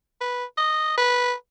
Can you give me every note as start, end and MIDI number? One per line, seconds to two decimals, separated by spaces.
0.21 0.44 71
0.57 0.96 75
0.97 1.33 71